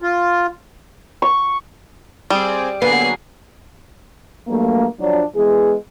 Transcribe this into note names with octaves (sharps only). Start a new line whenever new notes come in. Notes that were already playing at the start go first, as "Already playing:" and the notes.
F4
C#6
G3 C4 G#4 D5
D3 F#3 A#3 B3 G#4 C7
G2 F#3 A3 A#3
F3 F#3 D4
E3 G#3 B3 G#4